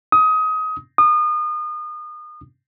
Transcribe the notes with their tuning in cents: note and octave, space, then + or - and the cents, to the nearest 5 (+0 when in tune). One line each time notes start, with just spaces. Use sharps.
D#6 +20
D#6 -35